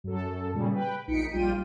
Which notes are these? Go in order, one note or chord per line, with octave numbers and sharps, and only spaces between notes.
F#2 A4
A#2 C#3 G3
B4 G5
A#1 D#4 B6 C#7 D7
A#1 G3 F4 G5 D#7